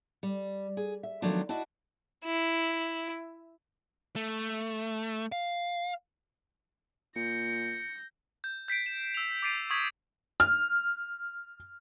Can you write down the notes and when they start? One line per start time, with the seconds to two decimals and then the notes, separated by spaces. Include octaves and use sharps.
0.23 G3
0.77 G#4
1.03 E5
1.22 D#3 F3 F#3 A3 B3 D4
1.49 D4 E4 F#4 D#5
2.25 E4
4.16 A3
5.32 F5
7.16 A#2 G6 A#6 C#7
8.44 G6
8.68 G6 B6 C7 D7
8.86 E7
9.15 E6 F7
9.43 D6 G6 A6 C7 D7 D#7
9.70 C#6 D#6 G#6 B6
10.40 F6